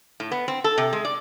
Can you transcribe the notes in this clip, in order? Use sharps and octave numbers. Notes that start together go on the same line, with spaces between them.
A2
B3
C4
A4
C3
G#3
D5